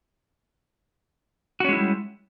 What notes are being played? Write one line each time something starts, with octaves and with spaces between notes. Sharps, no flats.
G3 G#3 C#4 E4 F#4